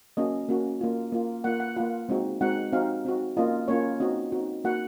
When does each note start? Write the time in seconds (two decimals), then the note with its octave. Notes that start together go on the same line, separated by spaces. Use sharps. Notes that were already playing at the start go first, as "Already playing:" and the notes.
0.17 A#3 C#4 F#4 D#5
0.49 A#3 C#4 F#4
0.81 A#3 F4
1.12 A#3 F4
1.44 A#3 F4 F#5
1.60 F#5
1.76 A#3 F4 F#5
2.09 G#3 C4 D#4 F#4
2.41 G#3 C4 D#4 F#4 F#5
2.72 C4 D#4 F#4 F5
3.05 C4 D#4 F#4
3.37 A#3 C#4 F4 D#5
3.68 A#3 C#4 F4 C#5
4.00 C4 D#4 F#4 D#5
4.32 C4 D#4 F#4
4.64 A#3 D#4 F#4 F#5